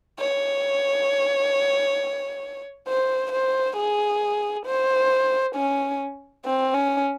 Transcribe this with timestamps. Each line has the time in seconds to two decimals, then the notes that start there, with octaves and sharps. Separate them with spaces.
0.19 C#5
2.88 C5
3.32 C5
3.76 G#4
4.66 C5
5.55 C#4
6.45 C4
6.74 C#4